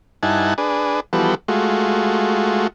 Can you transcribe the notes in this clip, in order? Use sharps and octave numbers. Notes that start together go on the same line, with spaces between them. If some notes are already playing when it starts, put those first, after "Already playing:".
G2 D#4 E4 F#5 G#5 A5
D4 G#4 B4
E3 F3 G3 B3 F#4 A4
G#3 A3 F4 F#4